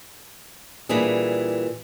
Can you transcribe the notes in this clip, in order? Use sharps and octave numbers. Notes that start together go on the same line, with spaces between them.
A#2 E3 G3 D4 G#4